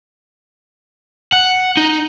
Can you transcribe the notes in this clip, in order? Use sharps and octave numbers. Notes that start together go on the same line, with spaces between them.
F#5
D#4